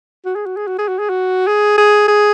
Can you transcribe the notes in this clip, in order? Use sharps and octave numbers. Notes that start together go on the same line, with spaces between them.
F#4
G#4
F#4
G#4
F#4
G#4
F#4
G#4
F#4
G#4
G#4
G#4